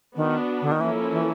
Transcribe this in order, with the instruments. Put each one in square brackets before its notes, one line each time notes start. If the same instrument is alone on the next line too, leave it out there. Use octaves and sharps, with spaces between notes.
[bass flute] D#3 [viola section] B3 D4 F#4
[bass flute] D3
D#3
[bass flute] E3 [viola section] F3 A#3 C#4 E4 A4
[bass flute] E3